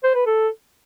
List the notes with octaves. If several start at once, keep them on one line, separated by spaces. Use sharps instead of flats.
C5
B4
A4